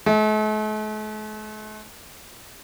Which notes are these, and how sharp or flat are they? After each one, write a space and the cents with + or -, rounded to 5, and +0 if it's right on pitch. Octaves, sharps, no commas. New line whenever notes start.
A3 -45